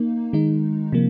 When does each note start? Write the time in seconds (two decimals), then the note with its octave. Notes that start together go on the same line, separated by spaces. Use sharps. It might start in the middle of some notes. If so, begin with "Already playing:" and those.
Already playing: A#3 D#4
0.33 D#3 G#3 D#4
0.92 C3 F3 A#3